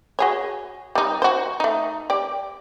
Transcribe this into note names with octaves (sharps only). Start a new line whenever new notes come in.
F#4 G#4 C#5
G3 D#4
F#4 C5
A3 D#4
G4 D5